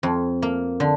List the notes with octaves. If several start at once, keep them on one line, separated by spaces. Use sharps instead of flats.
F2
A#3
D3